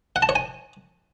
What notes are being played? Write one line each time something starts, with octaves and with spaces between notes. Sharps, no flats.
F#5
A5
C#5
G#5